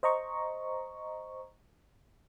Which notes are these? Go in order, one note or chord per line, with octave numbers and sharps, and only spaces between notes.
C5 D#5 A#5 C#6